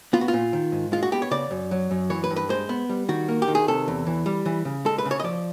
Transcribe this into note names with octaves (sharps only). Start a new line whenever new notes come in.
B3 F4
F#4
F4
A#2
D#3
G#2
G#3 F4
F#4
B3 G4
C#5
C#3 D5
F#2
F#3
F#2
E3 C#5
B4
G2
B4
G#3 C5
B3
G3
D#3 F#4
A#3
G4
D#3
G#4
C3 A4
E2
E3
G3
E3
C#3
G#3 A4
B4
C#3
C#5
D#5
F3 D5